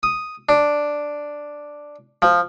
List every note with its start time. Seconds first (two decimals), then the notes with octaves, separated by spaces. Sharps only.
0.03 D#6
0.49 D4
2.22 F3